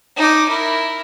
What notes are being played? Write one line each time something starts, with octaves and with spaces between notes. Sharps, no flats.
D#4 D6
E4 A#4